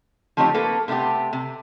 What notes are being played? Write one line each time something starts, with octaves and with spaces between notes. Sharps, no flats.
F3 A3 C4 D#4 G4 C#5
A#3 A4 B4
C3 A3 B3 E4 G4
C3